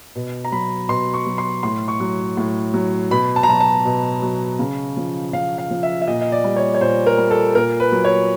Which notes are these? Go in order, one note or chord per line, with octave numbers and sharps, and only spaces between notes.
B2
A#5
F#3 B5
B2 C6
C#6
F#3
C6
A2 C6
C#6
F#3
A2
F#3
B2 B5
A5
A#5
F#3 A5
A5
B2
F#3
C#3
F3
C#3 F5
F5
F3
E5
E5
A#2 D#5
D#5
D5
G3
C#5
C#5
A#2 C5
A#4
G3
A4
A#2 A#4
B4
F#3
C#5